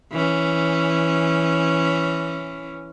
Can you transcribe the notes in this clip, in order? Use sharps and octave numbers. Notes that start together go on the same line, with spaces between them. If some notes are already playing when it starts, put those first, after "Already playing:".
E3 C#4